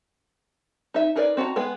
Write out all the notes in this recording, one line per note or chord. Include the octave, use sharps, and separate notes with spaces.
D#4 E5
D#4 G#4 A#4 B4 D5
C4 F#4 A5 A#5
G#3 B3 G#4 B4 G5